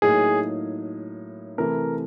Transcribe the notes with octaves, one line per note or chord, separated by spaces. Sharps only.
A2 F#3 A#3 D#4 G#4
C3 E3 A3 A#4